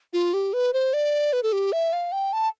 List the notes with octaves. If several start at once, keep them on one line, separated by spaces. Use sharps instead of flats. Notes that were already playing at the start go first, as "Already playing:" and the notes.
F4
G4
B4
C5
D5
B4
A4
G4
E5
F5
G5
A5